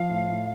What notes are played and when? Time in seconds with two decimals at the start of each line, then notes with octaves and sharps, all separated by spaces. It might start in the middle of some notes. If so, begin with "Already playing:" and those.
Already playing: F3 F5
0.10 A2
0.28 A2